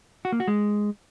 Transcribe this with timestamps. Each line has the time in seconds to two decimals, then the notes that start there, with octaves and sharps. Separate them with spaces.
0.25 F#4
0.32 A#3
0.40 F#4
0.48 G#3